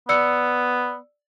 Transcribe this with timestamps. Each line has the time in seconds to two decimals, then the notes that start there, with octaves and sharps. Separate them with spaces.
0.09 B3 D5 E6 C#7